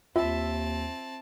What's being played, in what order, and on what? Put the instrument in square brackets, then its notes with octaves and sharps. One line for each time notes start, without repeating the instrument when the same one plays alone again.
[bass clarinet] D#2 [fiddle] C4 A5 [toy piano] F4 [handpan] E5